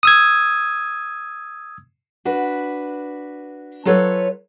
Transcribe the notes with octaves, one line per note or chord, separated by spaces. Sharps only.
D#6 E6 G#6
D4 F#4 B4
F#3 F4 A4 B4 C#5